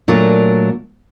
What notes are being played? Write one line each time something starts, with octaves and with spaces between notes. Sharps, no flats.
A#2 F#3 A3 D4 A#4